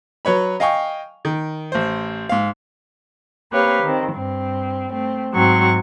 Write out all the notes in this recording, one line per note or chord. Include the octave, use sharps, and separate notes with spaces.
F#3 B4 C#5 B5
D#5 F5 G5 G#5 C#6
D#3
A1 C5
G#2 F5
A#3 C4 G4 B4 C#5 F5
D#3 C4
G2 C4
A3 C4
G#2 F#3 C4 C#6